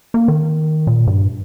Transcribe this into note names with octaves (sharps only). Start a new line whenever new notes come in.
A#3
D#3
A#2
G2